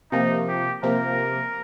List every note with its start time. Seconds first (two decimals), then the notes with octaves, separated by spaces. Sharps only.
0.12 C3 F3 A#3 D#4
0.48 G4
0.83 C3 F3 A#3 A#4